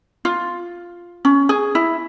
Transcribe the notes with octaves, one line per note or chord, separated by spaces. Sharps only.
F4
C#4
G#4
E4